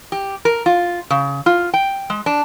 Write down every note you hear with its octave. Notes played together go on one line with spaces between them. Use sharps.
G4
A#4
F4
C#3
F4
G5
G#3
D4